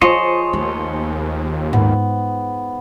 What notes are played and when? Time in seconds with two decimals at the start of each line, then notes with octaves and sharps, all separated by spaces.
0.01 F3 F4 G#4 C5 C#5 D#5
0.53 D#2 A3
1.73 G#2 B3